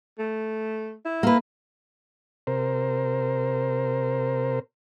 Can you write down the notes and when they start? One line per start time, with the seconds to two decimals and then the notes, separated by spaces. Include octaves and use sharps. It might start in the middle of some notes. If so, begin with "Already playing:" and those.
0.19 A3
1.05 E4
1.23 A#3 B4
2.47 C3 A#4 C5